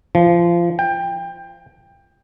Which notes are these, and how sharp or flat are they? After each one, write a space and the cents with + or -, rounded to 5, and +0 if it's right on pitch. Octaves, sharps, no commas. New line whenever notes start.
F3 -25
G5 +20